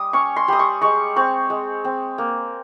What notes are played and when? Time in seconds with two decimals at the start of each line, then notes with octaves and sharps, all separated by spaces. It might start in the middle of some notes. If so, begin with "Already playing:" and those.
Already playing: G3 D#6
0.13 C#4 C#6
0.36 C6
0.48 G3 D#6
0.59 C#6
0.81 G#3 C#6
1.16 C4 C#6
1.50 G#3
1.85 C4
2.18 A#3